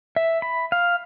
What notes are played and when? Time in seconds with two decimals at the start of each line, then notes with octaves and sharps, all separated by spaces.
0.16 E5
0.42 B5
0.72 F5